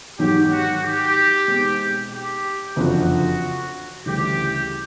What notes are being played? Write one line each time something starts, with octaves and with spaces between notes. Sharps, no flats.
G#2 D#3 F#3 G4
F#4
G4
B2 G#3 C4 D#4
G4
F#1 F2 D3 F3 F#4
D2 C#3 E3 G3 G4